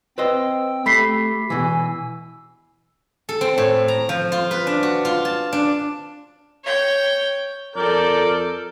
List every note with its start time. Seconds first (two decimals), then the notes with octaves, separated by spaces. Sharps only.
0.18 C4 B4 C5 D#5 G5 E6
0.86 A3 G4 B5 B6 C7
1.50 B2 E3 G#5 E6
3.29 A4
3.41 C4
3.58 A2
3.88 A#5
4.09 F3
4.32 F4
4.51 B4
4.67 D4
4.83 F#4
5.05 F4
5.25 A5
5.52 D4
6.64 C#5 G5
7.76 F2 A4 A#4 D5 G6